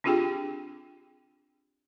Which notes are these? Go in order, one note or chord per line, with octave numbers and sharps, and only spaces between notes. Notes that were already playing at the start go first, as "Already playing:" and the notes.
C4 D4 F4 G4 G#4 G5